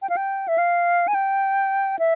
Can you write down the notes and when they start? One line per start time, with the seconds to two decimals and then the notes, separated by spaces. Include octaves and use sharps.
0.02 G5
0.10 F5
0.17 G5
0.48 E5
0.58 F5
1.08 G#5
1.14 G5
1.99 E5